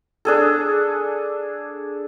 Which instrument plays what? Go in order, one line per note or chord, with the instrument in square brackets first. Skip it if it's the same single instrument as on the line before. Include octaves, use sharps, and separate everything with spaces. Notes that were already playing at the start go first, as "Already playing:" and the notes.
[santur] D4 G#4 A4